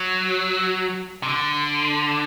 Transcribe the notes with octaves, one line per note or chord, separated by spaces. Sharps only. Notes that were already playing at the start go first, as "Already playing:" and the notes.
Already playing: F#3
C3
D3